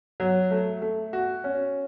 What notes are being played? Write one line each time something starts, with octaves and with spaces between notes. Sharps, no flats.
F#3
A3
A3
F#4
C#4